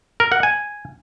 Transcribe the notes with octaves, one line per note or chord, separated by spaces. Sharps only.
A#4
F#5
G#5